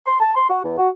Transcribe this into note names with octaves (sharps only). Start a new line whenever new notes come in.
C6
A5
C6
F#4
E2
F#4